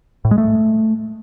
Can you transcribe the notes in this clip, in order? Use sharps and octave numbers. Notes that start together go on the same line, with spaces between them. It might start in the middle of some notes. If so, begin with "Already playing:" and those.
A2
G#3
A3